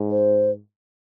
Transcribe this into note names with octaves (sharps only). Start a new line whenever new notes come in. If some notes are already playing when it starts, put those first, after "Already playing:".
Already playing: G#2
C5